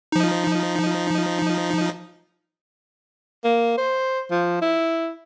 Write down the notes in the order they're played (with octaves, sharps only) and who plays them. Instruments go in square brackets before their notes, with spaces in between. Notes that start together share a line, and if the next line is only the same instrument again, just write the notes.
[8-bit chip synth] F3 D#4
[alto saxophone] A#3
C5
F3
E4